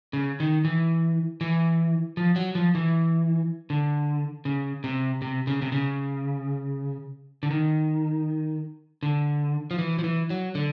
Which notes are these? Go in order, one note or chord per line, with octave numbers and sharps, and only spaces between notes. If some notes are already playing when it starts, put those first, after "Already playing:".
C#3
D#3
E3
E3
F3
F#3
F3
E3
D3
C#3
C3
C3
C#3
C3
C#3
D3
D#3
D3
F3
E3
F3
E3
F#3
D3